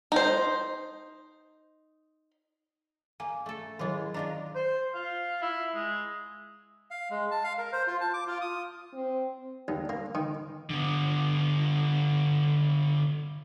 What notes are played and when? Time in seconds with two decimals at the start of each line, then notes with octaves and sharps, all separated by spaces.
0.12 D#4 C5
3.20 A#3 G#5
3.46 A3 A4
3.79 D#3 F#3 G#3 E4 F4
4.14 D4 F4 A#4 D#5 A#5
4.55 C5
4.95 F4
5.42 E4
5.75 G#3
6.91 F5
7.11 G#3
7.31 A5
7.44 F5
7.58 A#4
7.73 C5
7.87 F4
8.01 A5
8.14 D6
8.27 F4
8.41 D#6
8.93 C4
9.68 D#2
9.89 A#3
10.15 D#3
10.70 D3 B3